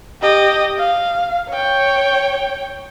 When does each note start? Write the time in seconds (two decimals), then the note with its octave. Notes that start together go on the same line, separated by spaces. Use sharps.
0.22 G4 D#5
0.78 F5
1.49 C#5 G5